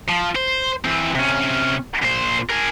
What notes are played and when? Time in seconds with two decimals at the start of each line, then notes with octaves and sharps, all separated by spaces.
0.09 F3
0.36 C5
0.85 E3 C4
1.15 C3 C#4
2.03 A#2 C5
2.49 G#4 A#4